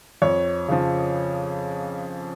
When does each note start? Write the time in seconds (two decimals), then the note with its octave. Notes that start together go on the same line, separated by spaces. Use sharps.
0.22 F2 C#5
0.68 C#3 F3